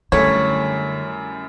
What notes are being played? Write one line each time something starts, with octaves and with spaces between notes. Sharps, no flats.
F#2 D3 G3 A3 E4 C#5 D#7